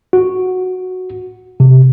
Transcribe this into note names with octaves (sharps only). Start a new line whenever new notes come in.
F#4
C3